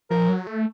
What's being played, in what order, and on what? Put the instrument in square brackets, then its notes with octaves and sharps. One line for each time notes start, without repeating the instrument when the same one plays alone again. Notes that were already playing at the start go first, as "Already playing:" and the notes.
[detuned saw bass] F3 [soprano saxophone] A#4
[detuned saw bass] F#3
A3